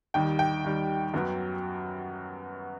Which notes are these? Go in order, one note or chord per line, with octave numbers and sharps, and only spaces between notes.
D#2 D#3 G3 G5
G5
D#2 D#3 G3
F#2 F#3 B3